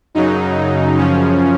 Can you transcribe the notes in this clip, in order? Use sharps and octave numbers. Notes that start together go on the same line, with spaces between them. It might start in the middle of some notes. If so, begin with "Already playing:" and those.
F#2 C#3 F#3 D#4
F#2 C#3 F3 C#4